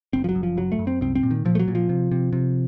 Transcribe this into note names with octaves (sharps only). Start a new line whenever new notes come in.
F#1 C4
F3
F#3
F#2
F3
F#1 F#3
A3
F#2
C4
C2 C4
C4
A#2
D#3
A#2 F3
A3
F#3
A#2
F3
C3
C3
C3